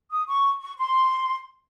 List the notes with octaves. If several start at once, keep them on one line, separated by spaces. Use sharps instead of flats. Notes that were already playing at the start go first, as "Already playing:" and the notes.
D#6
C#6
C#6
C6